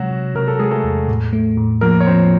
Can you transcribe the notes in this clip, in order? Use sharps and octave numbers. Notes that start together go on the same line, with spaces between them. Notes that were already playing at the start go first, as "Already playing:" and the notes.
Already playing: C3 F#3 G#3 F#4
C3
C3 A#4
A4
G#3 G#4
A3 A4
E2
A2
A3
A2
F3 A#3 A#4
C#5
F3 C4 C5